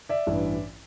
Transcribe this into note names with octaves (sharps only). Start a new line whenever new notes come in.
D5 E5
A1 G2 E3